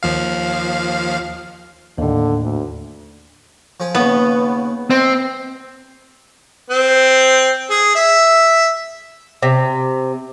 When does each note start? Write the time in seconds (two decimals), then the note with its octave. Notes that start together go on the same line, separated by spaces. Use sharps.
0.03 D#2 F3 F5
1.98 D#2 A2 D3
2.41 D2
3.80 F3 G#4
3.95 D#2 C#3 B3
4.90 C4 D#5
6.70 C4
7.70 G#4
7.95 E5
9.42 C3